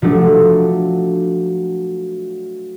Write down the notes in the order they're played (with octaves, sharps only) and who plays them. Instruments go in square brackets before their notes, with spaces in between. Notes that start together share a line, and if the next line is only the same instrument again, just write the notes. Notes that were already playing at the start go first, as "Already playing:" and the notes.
[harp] F3 F#3 A3 D4